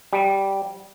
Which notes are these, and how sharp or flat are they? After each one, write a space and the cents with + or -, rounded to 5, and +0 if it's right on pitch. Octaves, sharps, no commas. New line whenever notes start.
G3 -10